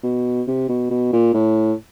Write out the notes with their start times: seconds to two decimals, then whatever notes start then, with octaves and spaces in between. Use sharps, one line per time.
0.03 B2
0.47 C3
0.69 B2
0.90 B2
1.13 A#2
1.34 A2